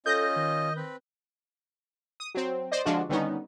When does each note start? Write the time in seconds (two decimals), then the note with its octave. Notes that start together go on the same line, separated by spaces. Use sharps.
0.06 C#4 F4 A4 D#5 G6 A#6
0.36 D#3
0.76 C4 B4
2.20 D#6
2.35 F#3 C4
2.72 C5 D5 D#5
2.86 D3 F3 G#3 D4 F4 F#4
3.09 D3 D#3 G3 B3 C#4 D#4